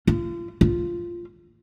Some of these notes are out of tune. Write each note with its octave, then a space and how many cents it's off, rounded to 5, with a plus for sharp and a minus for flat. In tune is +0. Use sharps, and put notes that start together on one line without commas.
F4 -35
F4 -10